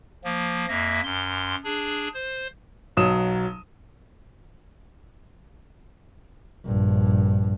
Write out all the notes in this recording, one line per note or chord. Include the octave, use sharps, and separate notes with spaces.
F3 A#3
F2 A#3 E5 A#6
F#2 C6
D4 G#4
C5
B1 F#3 D#6 E7
A#1 G2